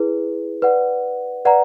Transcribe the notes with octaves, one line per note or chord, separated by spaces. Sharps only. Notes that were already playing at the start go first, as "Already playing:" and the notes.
Already playing: E4 G#4 B4
B4 D5 F#5
B4 D5 F#5 A#5